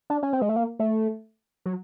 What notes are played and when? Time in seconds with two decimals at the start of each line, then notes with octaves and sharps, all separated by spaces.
0.10 D4
0.23 C#4
0.33 C4
0.42 G#3
0.49 A3
0.56 A#3
0.79 A3
1.66 F#3